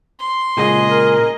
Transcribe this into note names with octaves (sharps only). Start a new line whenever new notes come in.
C6
A#2 C#3 G#3 G#4 D#5
A#4